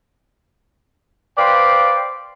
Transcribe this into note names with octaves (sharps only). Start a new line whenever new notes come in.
B4 C5 D5 F5 G5